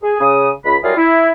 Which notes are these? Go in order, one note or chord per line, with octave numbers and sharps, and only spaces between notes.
G#4
C#3 D#6
C#2 B5
F#3 G3 E4 F4 G#4 A#4
E4